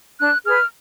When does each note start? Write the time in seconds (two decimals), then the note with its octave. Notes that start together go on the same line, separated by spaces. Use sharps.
0.20 D4 F#6
0.46 G#4 B4 F6